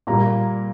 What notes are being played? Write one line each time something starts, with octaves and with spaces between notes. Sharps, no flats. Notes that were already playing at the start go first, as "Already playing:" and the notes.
A#2 G3 A#3 A#5